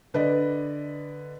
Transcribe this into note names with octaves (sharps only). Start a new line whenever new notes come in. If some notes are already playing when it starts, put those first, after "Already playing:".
D3 B4 D5 D#5